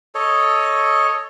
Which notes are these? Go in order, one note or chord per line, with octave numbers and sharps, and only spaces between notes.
A4 C#5 D#5